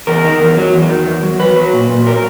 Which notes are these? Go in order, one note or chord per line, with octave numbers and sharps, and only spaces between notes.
E2 A#4
D#3
E2
F#3
E2
D#3
E2
F#3
F#3 B4
F#3
A#2
A#2
F#3 A#4